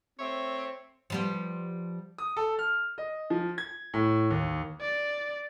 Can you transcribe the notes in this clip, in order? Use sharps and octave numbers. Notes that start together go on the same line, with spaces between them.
A3 C4 C#5 E5
F3 G3 B3
D#6
A4
F6
D#5
F3
G#6
A2
D#2
D5